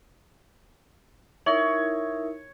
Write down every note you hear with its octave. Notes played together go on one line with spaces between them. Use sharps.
D#4 E4 A#4 C#5 E5